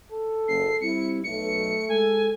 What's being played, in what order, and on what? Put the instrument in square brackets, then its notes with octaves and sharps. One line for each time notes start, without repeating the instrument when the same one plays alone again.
[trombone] A4
[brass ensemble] F#1 [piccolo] C7
[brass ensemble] G3 C4 E4 [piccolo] C#7
[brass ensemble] B1 [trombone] A3 [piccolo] C#7
[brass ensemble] G#3 A4 [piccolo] G#5